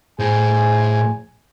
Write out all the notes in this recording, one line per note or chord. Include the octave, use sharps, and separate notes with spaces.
A2 G#4 C5 G#5